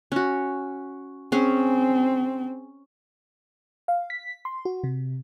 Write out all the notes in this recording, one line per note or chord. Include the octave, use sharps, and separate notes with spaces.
C#4 F#4
C4 C#4 G#4
F5
B6
C6
F#4
C3